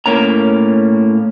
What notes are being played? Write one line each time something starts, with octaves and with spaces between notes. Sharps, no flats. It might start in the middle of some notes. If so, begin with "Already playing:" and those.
A2 A#3 C#4 A#5